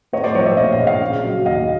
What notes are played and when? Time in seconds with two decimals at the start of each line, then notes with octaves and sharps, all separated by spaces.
0.13 A2 C#5 D#5
0.24 C5 D5
0.35 F3 C#5 D#5
0.46 D5 E5
0.57 A#1 D#5 F5
0.72 D#5 F5
0.80 A#1
0.87 D#5 F5
1.01 C#3
1.23 F#3
1.45 D#2 D#5 F5